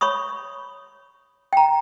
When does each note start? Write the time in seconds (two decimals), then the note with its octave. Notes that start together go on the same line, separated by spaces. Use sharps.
0.01 C#5 B5 C#6 D#6
1.53 G5 A#5